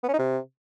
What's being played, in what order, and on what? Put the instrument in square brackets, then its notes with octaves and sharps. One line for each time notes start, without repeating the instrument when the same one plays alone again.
[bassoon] B3
C#4
D#4
C3